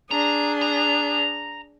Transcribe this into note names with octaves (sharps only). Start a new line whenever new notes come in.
D4 G#4 A#5
A#5